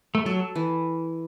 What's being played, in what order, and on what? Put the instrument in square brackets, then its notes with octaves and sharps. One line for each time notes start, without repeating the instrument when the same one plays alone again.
[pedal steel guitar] A3
[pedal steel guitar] F#3 [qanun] A4
[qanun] E3